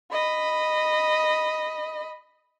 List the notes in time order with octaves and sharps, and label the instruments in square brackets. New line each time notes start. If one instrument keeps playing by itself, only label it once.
[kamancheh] D#5 B5